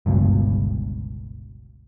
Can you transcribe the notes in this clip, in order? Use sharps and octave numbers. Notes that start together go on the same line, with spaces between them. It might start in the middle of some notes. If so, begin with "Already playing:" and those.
G1 C#2 G2 B2